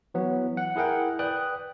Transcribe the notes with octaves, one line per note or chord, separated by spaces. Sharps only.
E3 F#3 B3
F#5
E4 G#4 A#4 F#5 G5
B4 D5 G5 D#6 F#6